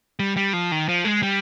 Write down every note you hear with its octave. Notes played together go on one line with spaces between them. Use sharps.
G3
G3
F3
D#3
F3
G#3
G3